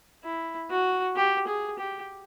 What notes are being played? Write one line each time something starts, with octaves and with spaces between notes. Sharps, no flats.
E4
F#4
G4
G#4
G4